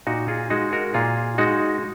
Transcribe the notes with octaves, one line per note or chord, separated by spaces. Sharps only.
A#2 D#4 F#4
F4 G#4
G#3 D#4 F#4
F#4 A#4
A#2 F4 G#4
G#3 D#4 F#4